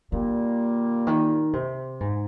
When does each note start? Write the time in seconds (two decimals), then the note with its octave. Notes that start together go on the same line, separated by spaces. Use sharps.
0.12 A#2 D3 G3 A#3
1.07 D#3
1.53 C3
2.00 G#2